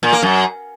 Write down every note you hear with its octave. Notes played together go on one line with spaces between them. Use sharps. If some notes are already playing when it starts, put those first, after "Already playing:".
A#2
A#3
F#2